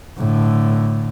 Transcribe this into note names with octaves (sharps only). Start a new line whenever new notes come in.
A2 D3